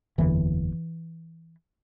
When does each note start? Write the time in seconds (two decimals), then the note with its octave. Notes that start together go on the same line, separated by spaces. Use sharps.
0.18 F#1 E2 D3 E3